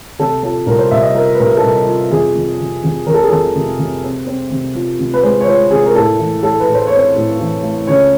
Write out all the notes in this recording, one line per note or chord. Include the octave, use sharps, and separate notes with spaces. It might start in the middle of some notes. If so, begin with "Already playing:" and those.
C3 A4
F3 A4
C2 A#4
C5
C2 E5
D#5
F3 A#4
B4
C2 A#4
A4
C2 A#4
F3
F2 G#4
F2
C3
F2
F2 A#4
A4
G#4
F2 A4
C3
C3
C4
C4
C3
F3
C3
B4
G#3 C5
C#5
F3 C5
C3 G#4
A#4
A2 A4
E3
A3 A4
B4
A2
C5
C4 C#5
C5
A2
E3
A3
C#2 C#5